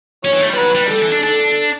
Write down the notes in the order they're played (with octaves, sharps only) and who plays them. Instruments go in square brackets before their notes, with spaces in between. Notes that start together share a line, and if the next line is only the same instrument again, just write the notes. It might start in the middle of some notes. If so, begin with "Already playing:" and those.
[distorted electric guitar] C#4 [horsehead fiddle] C#5
[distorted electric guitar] E3
A3
G3
[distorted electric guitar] F#3 [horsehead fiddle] B4
[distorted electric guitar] G3
[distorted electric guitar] G3 [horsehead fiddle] A4
[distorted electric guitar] E3
D4
[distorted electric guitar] D4 [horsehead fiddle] A4